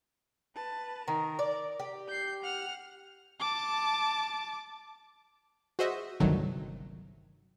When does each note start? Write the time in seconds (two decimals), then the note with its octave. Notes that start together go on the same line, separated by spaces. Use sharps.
0.55 B4 A5
1.08 D#3 A#4
1.39 D5
1.80 G4
2.08 G6 C7
2.42 F#5 F6
3.40 A5 D6
5.79 F#4 G#4 C5 D#5 E5
6.20 G1 C2 D#3 F#3 A3